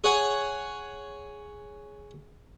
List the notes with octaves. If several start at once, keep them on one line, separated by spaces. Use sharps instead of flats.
G#4 C#5 F#5 G#5